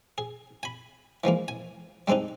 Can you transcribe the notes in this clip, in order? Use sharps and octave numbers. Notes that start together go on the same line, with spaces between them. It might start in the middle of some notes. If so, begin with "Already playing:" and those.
G#4
G#5 B5
E3 F3 G#3 A#3
G#5
G3 G#3 C4 D4 D#4